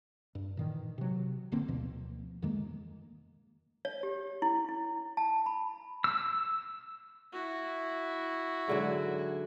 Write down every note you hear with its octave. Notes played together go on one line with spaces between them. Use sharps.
G2
A#2 D#3 E3
C3 F#3
G#1 D3 A#3 C4
D2 B2 F3
F2 D#3 G#3 A#3
C#5
G4
E4
E4
A5
B5
E6
E4 F#4
G#2 D3 F#3